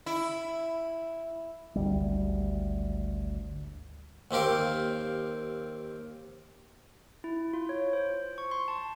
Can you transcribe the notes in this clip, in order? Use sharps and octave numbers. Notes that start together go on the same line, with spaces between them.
E4
G#1 D2 G3
D#2 C4 G4 A#4 F5
E4
F4
C#5
C5
C#6
C6
A5